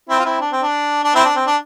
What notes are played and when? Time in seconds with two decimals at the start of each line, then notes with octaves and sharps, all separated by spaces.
0.09 C4 E4
0.19 F4
0.25 C4 E4
0.41 D4
0.52 C4
0.62 D4
1.04 D4
1.15 C4 E4
1.25 D4
1.36 C4
1.47 D4